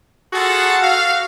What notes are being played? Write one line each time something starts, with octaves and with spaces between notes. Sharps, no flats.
F4 F#4 G#4 A4 F#5
F#4 F5